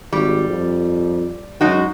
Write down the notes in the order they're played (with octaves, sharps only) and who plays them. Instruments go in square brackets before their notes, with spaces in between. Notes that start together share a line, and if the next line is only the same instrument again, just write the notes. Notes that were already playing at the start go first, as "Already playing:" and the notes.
[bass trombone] G#1 [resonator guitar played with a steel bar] G3
[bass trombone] F2
[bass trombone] F#2 [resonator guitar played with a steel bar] G#3 D#4 F#4